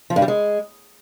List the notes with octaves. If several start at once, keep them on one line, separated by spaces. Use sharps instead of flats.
F3
G2
G3
G#3